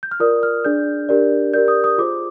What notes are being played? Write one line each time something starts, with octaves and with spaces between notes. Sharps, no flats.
G6
F6
F4 A#4 D5 D#6
F6
D4 G#4 D5 G6
D4 G4 A#4 D5
G4 A#4 D5 G6
D#6
D#6
F4 G#4 C5 D6